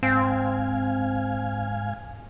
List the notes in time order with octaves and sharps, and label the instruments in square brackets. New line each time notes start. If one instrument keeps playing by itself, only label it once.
[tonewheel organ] G#2 F5 G#5 [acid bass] C4